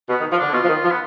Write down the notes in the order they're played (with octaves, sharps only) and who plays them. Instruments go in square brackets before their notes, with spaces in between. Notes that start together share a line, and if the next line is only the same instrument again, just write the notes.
[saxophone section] B2 [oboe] B3
[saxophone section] D#3
F3
[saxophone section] D3 [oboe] D4
[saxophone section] B2 [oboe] F4
[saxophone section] F3
D#3
F3
[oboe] B3